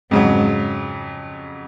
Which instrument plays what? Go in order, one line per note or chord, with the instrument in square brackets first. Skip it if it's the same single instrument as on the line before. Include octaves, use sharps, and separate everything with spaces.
[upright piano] F2 C#3 F#3 [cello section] G#2